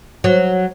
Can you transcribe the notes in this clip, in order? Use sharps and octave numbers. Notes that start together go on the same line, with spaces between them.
F#3